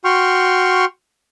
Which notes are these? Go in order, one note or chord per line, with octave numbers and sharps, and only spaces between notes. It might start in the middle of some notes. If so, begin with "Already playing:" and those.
F#4 G5 C6 C#6 F6